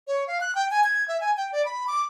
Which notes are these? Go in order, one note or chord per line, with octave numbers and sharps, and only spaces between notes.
C#5
F5
F#6
G5
G#5
G#6
E5
G#5
G5
D5
B5
D6